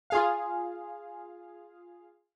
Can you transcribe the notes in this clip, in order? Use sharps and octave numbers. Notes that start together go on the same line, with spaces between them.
F4 G#4 F5